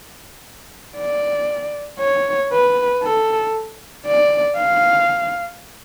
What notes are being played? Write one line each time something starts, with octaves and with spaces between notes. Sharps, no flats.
D5
C#5
B4
A4
D5
F5